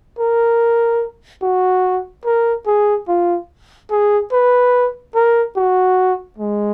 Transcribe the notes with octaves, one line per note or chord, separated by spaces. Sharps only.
A#4
F#4
A#4
G#4
F4
G#4
B4
A#4
F#4
G#3